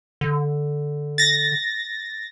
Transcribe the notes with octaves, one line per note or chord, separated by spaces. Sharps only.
D3
A6 A#6